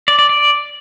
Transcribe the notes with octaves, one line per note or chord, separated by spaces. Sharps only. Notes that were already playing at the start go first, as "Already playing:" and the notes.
D5
D5
D5